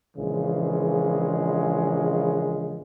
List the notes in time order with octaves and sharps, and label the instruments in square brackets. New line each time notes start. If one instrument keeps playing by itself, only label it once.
[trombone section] A#1 C#3 E3 G#3